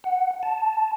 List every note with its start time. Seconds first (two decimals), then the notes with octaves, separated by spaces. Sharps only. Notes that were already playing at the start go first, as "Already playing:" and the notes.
0.04 F#5
0.43 A5